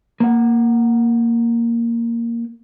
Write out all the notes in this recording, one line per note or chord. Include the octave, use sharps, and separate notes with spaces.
A#3 F#5